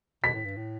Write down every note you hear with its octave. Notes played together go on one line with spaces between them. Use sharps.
B2 B6
A2
G2
A2